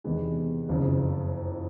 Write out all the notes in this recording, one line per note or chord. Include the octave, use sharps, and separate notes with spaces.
E2 C3 D#3 G#3 B3
F#1 F2 C#3